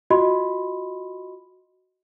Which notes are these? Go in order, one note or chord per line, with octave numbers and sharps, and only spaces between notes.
F4 F#4 D#5 B5 C6